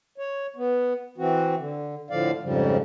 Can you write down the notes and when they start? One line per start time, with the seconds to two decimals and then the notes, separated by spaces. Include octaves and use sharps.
0.18 C#5
0.56 B3
1.18 E3 C4 F#4
1.58 D3
2.10 A2 D3 F3 D5 F5
2.43 F2 G#2 C#3 F3 G3